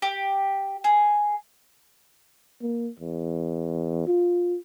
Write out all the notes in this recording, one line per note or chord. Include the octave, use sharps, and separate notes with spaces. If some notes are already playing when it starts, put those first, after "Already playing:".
G4
G#4
A#3
E2
F4